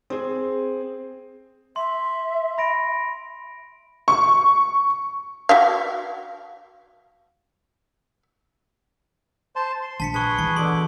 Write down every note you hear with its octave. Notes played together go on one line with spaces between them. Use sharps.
C4 G#4
E5 C6
B5 A#6 D7
C#6
F#4 E5 F5
C5 A5 C6
C6
A#1 A5 B6 C#7
G#4 B4 A5 C#6 G7
E3 C#6
B2 D3 C6 D6